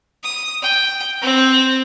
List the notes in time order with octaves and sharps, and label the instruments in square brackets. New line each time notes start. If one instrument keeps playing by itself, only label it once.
[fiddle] D#6
G5
C4